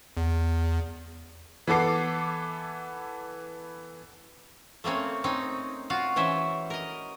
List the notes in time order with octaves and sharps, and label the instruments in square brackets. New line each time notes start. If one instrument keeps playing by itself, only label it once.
[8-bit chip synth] E2
[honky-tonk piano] E3 B3 A4 D6 C7
[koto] A3 A#3 C4 C#4
C4 C#4 D#4
F4 F#4 F5
E3 C#4 C5 E5
A#4 D#5